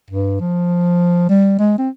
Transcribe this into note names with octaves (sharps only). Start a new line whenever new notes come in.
G2
F3
G3
G#3
C4